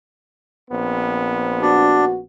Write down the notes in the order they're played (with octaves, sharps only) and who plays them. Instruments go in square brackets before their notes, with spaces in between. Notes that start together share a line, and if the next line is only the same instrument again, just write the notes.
[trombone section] A#1 B3 C4
[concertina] D4 [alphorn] F#4